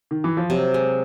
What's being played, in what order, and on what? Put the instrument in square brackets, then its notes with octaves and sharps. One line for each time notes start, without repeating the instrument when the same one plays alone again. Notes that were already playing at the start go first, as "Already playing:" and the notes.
[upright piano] D#3
E3
F3
[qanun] C3 [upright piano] F#3
[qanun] G#3